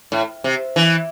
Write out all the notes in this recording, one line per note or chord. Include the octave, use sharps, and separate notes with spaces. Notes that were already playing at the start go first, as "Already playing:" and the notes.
A2
C3
E3